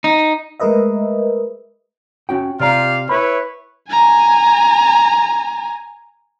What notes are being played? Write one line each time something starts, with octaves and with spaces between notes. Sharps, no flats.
D#4
G#3 A3 A#4 B4 D#5 E5
C#4 F#4 G5
C3 F4 G4 D5 F5 A#5
E4 B4 C#5 B5
G#5 A#5